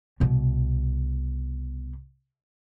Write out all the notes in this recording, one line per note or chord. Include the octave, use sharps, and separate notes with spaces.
C2 B2